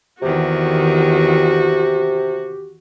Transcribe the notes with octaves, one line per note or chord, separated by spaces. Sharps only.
E2 C3 D#3 F#4 G4